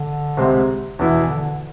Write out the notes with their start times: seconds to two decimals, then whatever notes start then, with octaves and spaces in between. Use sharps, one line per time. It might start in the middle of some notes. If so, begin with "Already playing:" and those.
Already playing: D3
0.37 C2 C3 G#3 C4
0.99 E2 B2 B3 E4
1.09 E3
1.20 E3
1.30 D3